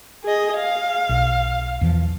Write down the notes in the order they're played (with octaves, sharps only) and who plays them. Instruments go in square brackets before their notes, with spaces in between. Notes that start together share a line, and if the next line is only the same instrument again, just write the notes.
[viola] G#4 D#5
F5
[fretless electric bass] B1
E2 E3 F3